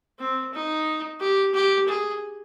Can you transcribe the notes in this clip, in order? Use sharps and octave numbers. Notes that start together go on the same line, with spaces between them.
C4
D#4
G4
G4
G#4